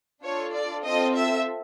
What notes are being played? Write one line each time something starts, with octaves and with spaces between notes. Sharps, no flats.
D4 F4 A4 C#5
D5
C4 F4 A4 D#5
E5